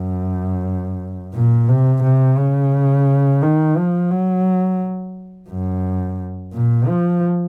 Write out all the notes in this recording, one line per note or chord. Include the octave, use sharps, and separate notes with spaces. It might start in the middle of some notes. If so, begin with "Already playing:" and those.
Already playing: F#2
A#2
C3
C3
C#3
D#3
F3
F#3
F#2
A#2
F3